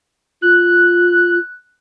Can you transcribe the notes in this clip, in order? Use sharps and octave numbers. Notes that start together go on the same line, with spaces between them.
F4 F#6